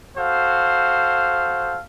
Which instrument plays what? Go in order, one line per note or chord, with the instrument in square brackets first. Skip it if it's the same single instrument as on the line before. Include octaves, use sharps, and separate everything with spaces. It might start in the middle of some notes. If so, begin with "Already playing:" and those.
[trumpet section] F#4 A4 C5 F5